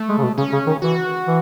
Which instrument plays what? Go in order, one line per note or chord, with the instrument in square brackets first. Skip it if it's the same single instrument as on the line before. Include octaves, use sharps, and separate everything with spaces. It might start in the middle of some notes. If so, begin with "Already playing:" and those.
Already playing: [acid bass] A3
[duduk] G#3
C#3
B2
[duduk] C#3 [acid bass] C#4
[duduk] C#3
D#3
[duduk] E3 [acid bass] F#4
[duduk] E3